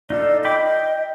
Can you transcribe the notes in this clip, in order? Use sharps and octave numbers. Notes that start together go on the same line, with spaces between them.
D#4 F4 A4 D5
D#5 G5 B5 D6
G5